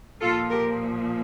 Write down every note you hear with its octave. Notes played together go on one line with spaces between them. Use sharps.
A#2 F3 F4 A4
G4 A#4